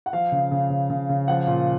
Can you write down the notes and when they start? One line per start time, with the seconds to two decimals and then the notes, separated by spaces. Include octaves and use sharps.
0.06 F#5
0.13 F3 F5
0.32 C#3
0.51 C#3
0.70 C#3
0.90 C#3
1.09 C#3
1.28 F3 F#5
1.47 A#2